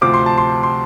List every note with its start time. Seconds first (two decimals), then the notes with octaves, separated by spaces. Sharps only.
0.01 D2 C3 F3 C4 D6
0.14 C6
0.26 A5
0.38 C6
0.63 C6